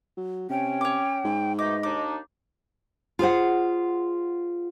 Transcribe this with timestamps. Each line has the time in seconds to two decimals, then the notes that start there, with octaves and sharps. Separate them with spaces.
0.17 F#3
0.50 C3 C#4 G5
0.81 C#5 D6
1.25 G#2
1.59 B2 A3 D#4 D#5 D6
1.83 D#2 D4 D#4 D6
3.19 F4 G#4 C5 F#5